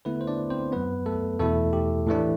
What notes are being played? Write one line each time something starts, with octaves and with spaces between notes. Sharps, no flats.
D3 A3 B3 E4 B4
C5
D4 D5
C4 C5
F#2 F#3 B3 B4
A3 A4
E2 B2 A3 E4 A4
G4
A2 E3 A3 D4